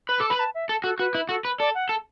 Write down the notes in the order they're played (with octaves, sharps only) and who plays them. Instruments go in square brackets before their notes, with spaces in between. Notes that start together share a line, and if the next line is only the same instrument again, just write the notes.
[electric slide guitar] B4 [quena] B5
[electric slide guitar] A4 [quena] D6
[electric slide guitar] B4 [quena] B5
[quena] A5
E5
[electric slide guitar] A4
[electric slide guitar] F#4 [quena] A4
[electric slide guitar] F#4 [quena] B4
[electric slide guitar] E4
[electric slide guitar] F#4 [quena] A4
[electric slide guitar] B4
[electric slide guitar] A4 [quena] D5
[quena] F#5
[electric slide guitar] A4